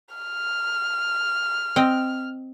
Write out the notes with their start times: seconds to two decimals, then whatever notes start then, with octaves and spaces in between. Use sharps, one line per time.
0.14 F6
1.76 C4 D#5 G5